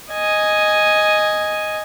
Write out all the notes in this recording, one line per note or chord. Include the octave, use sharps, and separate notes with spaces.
D#5 G#5